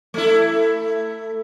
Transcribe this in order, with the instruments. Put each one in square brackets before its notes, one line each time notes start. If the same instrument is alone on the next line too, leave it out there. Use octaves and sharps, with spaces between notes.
[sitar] A3 E4